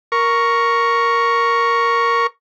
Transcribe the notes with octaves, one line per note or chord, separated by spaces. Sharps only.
A#4 C#6